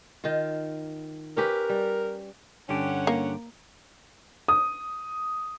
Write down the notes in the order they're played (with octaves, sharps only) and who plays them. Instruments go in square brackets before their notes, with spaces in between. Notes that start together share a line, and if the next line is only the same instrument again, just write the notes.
[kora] D#3 F4
[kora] C#4 G4 B4 [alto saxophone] A#4
[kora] G3
[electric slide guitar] G2 D3 G4 [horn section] C#4 F#5
[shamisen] A#3
[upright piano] D#6